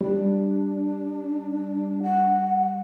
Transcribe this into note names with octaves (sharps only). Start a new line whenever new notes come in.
G3 D4
F#5